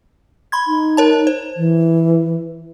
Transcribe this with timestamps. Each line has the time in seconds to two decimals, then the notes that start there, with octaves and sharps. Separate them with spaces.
0.52 B5 C6 G#6
0.67 D#4
0.97 A#4 C#5 A5
1.27 C5
1.57 E3